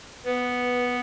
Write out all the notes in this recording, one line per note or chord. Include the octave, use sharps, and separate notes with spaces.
B3 B4